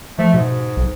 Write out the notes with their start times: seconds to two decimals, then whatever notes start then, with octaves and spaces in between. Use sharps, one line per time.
0.19 F3 A3
0.34 G#2 B2
0.77 B1